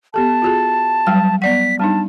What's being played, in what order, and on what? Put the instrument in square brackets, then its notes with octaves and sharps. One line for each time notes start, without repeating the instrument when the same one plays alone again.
[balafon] B3 G4 A4 [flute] A5
[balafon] F4 F#4 G#4
F#3 G3 G5
[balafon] B3 D5 F#5 [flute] B6
[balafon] G3 D4 D#4 [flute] A5